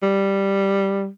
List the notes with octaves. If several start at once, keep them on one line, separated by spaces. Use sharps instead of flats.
G3